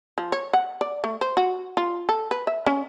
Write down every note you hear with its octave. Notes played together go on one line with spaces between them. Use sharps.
F3
C#5
F#5
D5
A3
C5
F#4
F4
A4
B4
E5
C#4